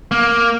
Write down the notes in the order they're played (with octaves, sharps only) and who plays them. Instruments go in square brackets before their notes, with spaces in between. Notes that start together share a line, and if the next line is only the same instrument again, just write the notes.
[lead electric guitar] A#3